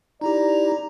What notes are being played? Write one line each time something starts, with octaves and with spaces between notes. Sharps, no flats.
D#4 E4 G4 D5 A#5